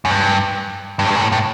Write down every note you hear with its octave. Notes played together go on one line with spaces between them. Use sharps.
F#2
G2
G2
A2
G2
A#2
A2
A2